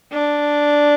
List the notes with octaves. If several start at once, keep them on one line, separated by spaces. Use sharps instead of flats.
D4